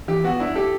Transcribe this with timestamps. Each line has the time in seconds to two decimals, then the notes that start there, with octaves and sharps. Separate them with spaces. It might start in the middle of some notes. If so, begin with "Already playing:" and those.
0.08 E3 G4
0.24 B3 F#4
0.40 D4 E4
0.55 G4 A4